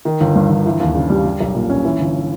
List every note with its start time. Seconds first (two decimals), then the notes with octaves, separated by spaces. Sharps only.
0.05 D#3
0.21 G1
0.35 G2
0.50 G1
0.66 E3
0.80 D#2
0.95 C#3
1.10 G3
1.25 G3
1.40 B1
1.55 A#2
1.70 C#4
1.85 E3
1.99 G1